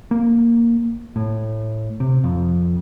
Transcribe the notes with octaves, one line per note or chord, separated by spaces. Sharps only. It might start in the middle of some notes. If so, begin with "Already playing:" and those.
A#3
A2
C3
F2